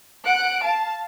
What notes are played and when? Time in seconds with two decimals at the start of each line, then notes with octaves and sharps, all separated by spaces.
0.24 F#5 F#6 D7
0.62 F5 A5